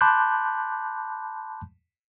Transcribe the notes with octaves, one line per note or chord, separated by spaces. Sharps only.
A5 B5 C6 D6 F#6 G6